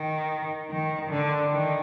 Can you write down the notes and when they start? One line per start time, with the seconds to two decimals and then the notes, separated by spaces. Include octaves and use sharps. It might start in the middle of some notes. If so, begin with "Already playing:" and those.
Already playing: D#3
0.70 D#3
1.10 D3
1.52 D#3